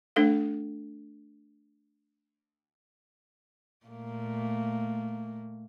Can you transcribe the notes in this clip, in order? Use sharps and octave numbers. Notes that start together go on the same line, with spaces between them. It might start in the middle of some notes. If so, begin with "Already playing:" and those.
A3 D4 A4 F5
A#2 A3 A#3